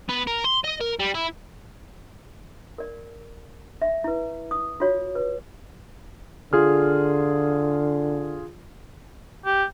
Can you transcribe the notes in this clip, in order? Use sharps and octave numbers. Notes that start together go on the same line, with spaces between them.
B3
A#4
C6
D#5
A#4
G3
E4
A#4 D5
E5
E4 B4
D#6
F4 F#4 C#5
B4
D3 F4 G#4 F6
G4